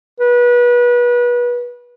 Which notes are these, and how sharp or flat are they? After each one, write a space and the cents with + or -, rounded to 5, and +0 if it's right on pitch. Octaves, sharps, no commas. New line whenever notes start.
B4 -30